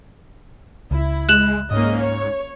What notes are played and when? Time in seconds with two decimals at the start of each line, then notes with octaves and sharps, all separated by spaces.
0.91 C#2 E4
1.29 G#3 F#6 E7 F#7
1.71 G#2 A#3 C#4 D#5
2.01 C#5